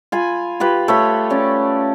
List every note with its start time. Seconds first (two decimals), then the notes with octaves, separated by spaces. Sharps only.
0.12 F4 G#5 B5
0.60 F4 G4 B4
0.88 A3 C#5 B5
1.30 C#4 D5